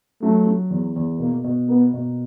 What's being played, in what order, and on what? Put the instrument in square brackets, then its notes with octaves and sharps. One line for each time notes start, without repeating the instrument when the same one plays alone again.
[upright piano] F#3 [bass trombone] A3
[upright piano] F#3
E2
E2
[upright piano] B2 [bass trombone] A#3
[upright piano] B2
[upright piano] A#3 [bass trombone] B3
[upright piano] B2